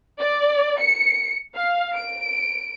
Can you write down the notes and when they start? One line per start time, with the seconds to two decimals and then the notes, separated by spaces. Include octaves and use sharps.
0.20 D5
0.81 C#7
1.55 F5
1.95 D7